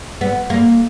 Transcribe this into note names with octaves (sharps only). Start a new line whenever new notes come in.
B3
A#3